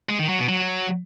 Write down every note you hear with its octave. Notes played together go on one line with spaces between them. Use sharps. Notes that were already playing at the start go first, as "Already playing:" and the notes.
G#3
D#3
F#3
B2
F#3